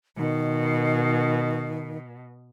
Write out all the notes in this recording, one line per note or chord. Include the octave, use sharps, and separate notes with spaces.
B2 D#3